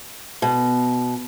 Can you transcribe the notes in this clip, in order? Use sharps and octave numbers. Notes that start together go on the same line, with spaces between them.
B2